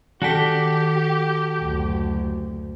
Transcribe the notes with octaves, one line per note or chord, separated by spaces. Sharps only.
D#3 F#4 G4 A4 G5 B6
F#1 D2